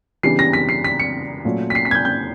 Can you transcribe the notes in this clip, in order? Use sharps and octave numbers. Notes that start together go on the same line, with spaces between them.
C#3 E3 G3 B3 D4 C7
A#6
B6
C7
B6
C#7
A#2 F#3 A3 C#4 F4
B6
C7
B6
G#6
G6
G6